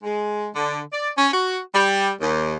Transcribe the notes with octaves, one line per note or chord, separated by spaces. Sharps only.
G#3
D3
D5
C#4
F#4
G3
D#2